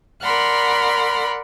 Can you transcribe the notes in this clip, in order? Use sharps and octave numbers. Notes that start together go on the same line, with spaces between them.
A#4 D5 F#5 B5 C6 F6